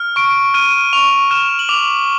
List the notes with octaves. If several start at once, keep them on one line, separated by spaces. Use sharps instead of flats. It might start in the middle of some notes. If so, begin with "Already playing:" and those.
Already playing: F6
C#6 D7
F6 D#7
C#6 F7
F6 E7
F#7
D6 F7